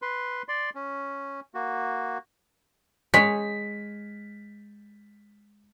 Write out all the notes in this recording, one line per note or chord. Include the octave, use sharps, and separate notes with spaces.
B4 C6
D5 C6
C#4
A#3 F#4
G#3 C#5 B6